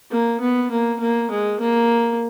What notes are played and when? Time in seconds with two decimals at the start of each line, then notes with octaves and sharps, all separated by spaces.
0.11 A#3
0.41 B3
0.71 A#3
1.00 A#3
1.31 G#3
1.60 A#3